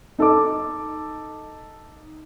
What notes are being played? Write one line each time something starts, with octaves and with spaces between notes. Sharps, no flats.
D#4 A4 D#5 D6